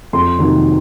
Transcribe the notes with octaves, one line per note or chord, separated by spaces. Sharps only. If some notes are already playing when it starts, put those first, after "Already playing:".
F2 C6
C3 D#3 F#3 A#3